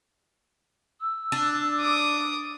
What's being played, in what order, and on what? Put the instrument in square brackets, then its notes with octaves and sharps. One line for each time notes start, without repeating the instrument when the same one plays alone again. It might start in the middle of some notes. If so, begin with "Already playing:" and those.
[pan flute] E6
[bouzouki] D4
[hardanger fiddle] D6 D#6